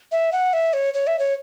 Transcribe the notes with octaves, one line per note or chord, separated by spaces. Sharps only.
E5
F#5
E5
C#5
C#5
E5
C#5